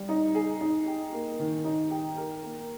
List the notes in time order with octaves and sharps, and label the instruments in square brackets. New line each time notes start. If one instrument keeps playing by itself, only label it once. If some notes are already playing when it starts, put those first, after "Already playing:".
Already playing: [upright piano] G3
D#4
G#4
D#4
G4
A#3
D#3
D#4
G4
A#4
A#3